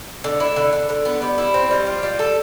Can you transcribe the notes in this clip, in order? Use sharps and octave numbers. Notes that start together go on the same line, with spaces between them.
D3
E4
D3
D3
D3
B3
G3
E4
C4
G3
F4
G3
A4